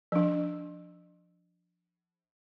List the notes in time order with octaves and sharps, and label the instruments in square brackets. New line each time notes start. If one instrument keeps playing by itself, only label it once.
[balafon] F3 D4